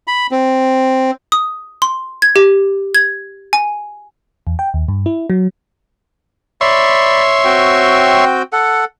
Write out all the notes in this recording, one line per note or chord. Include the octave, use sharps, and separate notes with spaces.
B5
C4
D#6
C6
G#6
G4
G#6
G#5
E2
G5
D#2
G2
E4
F#3
C#5 D5 E5 B5 C6
C4 F#4 G5
A4 F#5